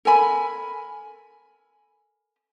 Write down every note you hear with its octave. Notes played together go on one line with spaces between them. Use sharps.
A4 A#4 G#5 B5